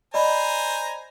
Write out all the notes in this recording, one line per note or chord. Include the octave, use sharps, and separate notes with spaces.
C5 D5 D#5 G#5 A#5 B5